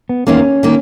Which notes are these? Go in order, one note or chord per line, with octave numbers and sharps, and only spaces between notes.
B3
E2 D#3 A#3 C#4
D#3 A#3